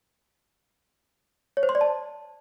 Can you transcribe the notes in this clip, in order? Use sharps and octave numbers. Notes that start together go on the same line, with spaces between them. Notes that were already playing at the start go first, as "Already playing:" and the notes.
C#5
C5
C6
D5
A5